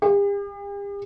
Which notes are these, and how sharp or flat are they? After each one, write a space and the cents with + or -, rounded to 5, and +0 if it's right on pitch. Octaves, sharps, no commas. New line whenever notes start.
G4 +45